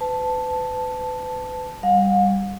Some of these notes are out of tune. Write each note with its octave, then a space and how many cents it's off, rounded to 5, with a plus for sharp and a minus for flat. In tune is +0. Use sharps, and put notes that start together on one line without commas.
B4 +35 A5 +0
G3 +5 F5 +40